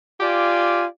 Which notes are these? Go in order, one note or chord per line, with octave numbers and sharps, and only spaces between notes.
F4 G4 D5 G#5